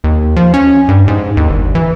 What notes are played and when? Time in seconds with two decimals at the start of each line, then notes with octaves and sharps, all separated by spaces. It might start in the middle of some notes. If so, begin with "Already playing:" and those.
0.04 D#2
0.36 F3
0.54 C#4
0.89 G2
1.08 G#2
1.37 D#2
1.50 G1
1.75 E3